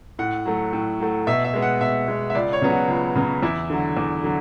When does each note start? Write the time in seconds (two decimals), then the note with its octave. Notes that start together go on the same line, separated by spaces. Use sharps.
0.19 A2 F#5
0.45 F#3 A3
0.73 A2
1.00 F#3 A3
1.27 B2 E5
1.44 E5
1.54 G#3 B3
1.62 F#5
1.81 B2 E5
2.08 G#3 B3
2.30 E5
2.35 C#2 D5
2.53 C#5
2.62 C#3 F#3 B3
2.70 F#4
2.88 C#2
3.15 C#3 F#3 B3
3.43 E2 E4
3.70 D3 F#3
3.97 E2
4.24 D3 F#3